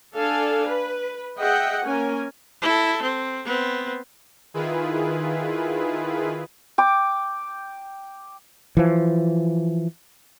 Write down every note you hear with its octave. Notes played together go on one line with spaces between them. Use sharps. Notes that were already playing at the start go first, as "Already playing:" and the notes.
D4 A4 F5 G#5
B4
G#4 D#5 E5 F#5 G5
A#3 C#4 A#4 G#5
E4 A4
C4
B3 C4
D#3 E4 F4 G#4 B4
G5 D6
E3 F3